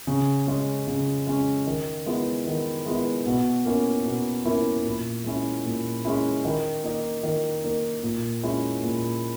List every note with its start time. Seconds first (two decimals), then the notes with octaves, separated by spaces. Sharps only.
0.07 C#3
0.47 G#3 C#4
0.87 C#3
1.27 G#3 C#4
1.67 D#3
2.06 G#3 B3 E4
2.47 D#3
2.86 G#3 B3 E4
3.26 B2
3.65 A#3 C#4 E4
4.05 B2
4.45 A#3 C#4 E4
4.85 A#2
5.24 G#3 C#4 E4
5.65 A#2
6.05 G#3 C#4 E4
6.45 D#3
6.83 A#3 D#4
7.23 D#3
7.64 A#3 D#4
8.03 A#2
8.43 G#3 C#4 E4
8.83 A#2